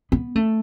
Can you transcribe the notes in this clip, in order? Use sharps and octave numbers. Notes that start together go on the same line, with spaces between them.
B3
A3